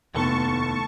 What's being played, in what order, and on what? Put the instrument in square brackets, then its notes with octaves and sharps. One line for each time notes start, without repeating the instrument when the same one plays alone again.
[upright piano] F1 [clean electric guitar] D#2 A2 A4 [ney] B3 [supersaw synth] A5 C#6